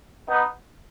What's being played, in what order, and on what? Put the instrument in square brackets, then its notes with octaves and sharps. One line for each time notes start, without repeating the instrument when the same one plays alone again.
[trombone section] B3 D#4